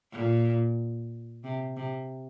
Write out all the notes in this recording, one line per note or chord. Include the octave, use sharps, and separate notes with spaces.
A#2
C3
C3